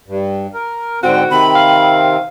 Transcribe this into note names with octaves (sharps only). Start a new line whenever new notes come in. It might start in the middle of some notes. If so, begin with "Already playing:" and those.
G2
A#4
G#2 D3 C4 F#4 G5
C3 D#3 C4 B5
F5